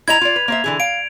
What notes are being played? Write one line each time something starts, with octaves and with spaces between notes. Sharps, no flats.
E4 D#5 A#5 G#6 F7
F4 D5
B4
A#3 C5 E5
D3 E3 G#4
F5 D7